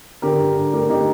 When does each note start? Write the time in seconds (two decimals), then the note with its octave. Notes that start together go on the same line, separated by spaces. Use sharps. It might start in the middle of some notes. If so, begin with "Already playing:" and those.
0.22 D3 G4 A#4
0.39 G2
0.56 G2
0.73 A3 G4 A#4
0.89 D3 D#4 G4